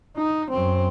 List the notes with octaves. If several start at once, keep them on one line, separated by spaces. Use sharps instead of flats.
D#4
F#2 C4